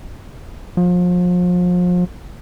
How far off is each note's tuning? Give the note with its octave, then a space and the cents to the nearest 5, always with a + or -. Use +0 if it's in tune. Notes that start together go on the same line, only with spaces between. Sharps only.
F3 +35